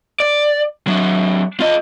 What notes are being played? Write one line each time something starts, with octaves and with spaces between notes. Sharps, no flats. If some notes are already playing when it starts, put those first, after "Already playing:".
D5
F#3 D4
F4 D#5